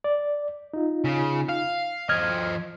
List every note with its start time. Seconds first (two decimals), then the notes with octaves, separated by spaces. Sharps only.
0.04 D5
0.74 D#4 F4
1.05 C#3
1.49 F5
2.09 F3 D#5 F6 G#6